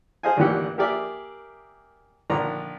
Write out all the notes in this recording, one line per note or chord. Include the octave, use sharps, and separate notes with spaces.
G#4 C5 D#5 F5 G#5
G#1 D2 A#2 E3 G4 F#5
A#3 G4 G#4 A#4 D5 E5
A#1 D3 D#3 A#5 C6